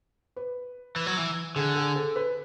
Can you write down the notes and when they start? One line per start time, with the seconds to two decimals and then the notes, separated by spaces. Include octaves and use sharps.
0.36 B4
0.96 E3
1.06 F#3
1.17 E3
1.56 D3 G#4
1.76 G#4
1.96 A4
2.16 B4